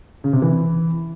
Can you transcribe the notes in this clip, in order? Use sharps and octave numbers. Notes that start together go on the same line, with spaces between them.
C#3
C3
E3